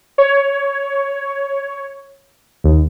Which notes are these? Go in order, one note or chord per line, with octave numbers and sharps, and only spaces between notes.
C#5
D#2